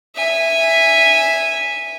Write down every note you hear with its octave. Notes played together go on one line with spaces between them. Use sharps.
E5 G#5